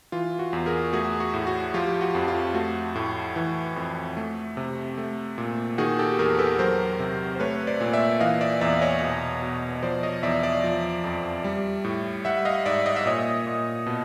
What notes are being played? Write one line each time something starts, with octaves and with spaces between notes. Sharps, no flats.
E3 F4
F#4
E2
G#4 A#4
A3 F#4 G#4
F#4
A2
F#4
F3 F4 G4
F#4
F2
F4
A3 F#4
A2
E3
F2
A3
C3
A3
A#2
D#3 F#4 G#4
G4 A4
E2 G#4 A#4
A4 B4
F#3 A#4 C5
C3
C5
A3 B4 C#5
C5 D5
A#2
D5 E5
E3 D#5 F5
D5 E5
E2 D5 E5
C#5 D#5
B2
B2
F3 C5 D5
C#5 D#5
E2 D5 E5
D5 E5
F3
F2
G3
A2
G3 E5 F#5
D#5 F5
G#2 D5 E5
D#5
E5
A#2 C#5 D#5
A#2
B2